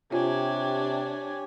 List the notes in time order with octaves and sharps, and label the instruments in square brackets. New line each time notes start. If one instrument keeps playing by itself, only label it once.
[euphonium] C3 [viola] D4 [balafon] F4 [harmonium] G4 C#5 G#5